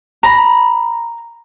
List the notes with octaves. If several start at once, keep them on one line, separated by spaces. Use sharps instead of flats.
A#5 B5